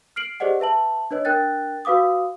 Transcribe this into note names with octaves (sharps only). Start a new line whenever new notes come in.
F6 C7 D7 F#7
G4 G#4 C5 D5 D#5 F#5
B4 E5 A5 F#7
D4 B4 C#5 D#5
D4 A#4 G5 F#6 A6
F#4 B4 F5 D6 D#6